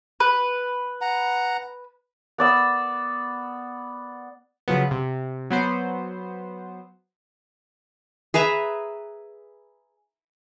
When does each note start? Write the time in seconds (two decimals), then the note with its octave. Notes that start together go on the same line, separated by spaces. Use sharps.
0.20 B4
1.01 F#5 A#5
2.38 B3 D5 E6
4.68 C#3 F3 F#3 B3
4.91 C3
5.50 F#3 B3 C5
8.34 G#4 B4 E5 A#5